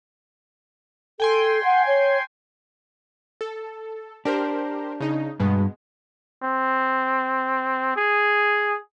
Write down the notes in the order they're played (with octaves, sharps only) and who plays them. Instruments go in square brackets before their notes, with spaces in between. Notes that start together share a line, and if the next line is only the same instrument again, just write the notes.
[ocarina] A4 [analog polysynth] G5 G#5 C6
[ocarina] F#5
C#5
[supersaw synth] A4
[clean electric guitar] D4 [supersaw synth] G4 A#4 C5
[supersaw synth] C#3 D#4
[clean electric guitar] G2 [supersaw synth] B2 G#3 B3
[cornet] C4
G#4